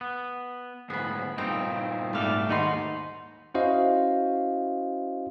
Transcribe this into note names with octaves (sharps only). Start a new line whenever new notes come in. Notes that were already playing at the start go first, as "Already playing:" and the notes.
B3
D2 G#2 B3 G#4 B5
G2 A#2 C4 D#4 G5
G#2 G3 A3 D5 F5
D#2 G#2 D#4 F#4 B5 C6
C#4 E4 F#4 C5 D#5 F5